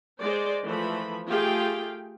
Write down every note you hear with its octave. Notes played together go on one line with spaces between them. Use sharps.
G#3 C5 D5
E3 F3 A3 B5
A3 F4 G4 G#4 F5 G5